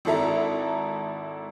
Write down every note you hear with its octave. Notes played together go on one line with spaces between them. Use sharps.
G#1 E4 A4 E5 A#5